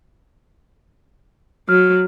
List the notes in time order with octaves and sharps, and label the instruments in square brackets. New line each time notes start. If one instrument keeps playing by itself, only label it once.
[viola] F#3 [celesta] F6